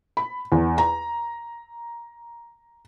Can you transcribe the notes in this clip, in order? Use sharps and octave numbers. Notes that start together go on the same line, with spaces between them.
B5
E2
A#5